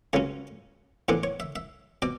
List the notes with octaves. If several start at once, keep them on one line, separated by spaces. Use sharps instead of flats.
C#2 C#3 F#3 C#4 C#5
A2 E3 B3 D4
C#5
E5
E5
B2 D5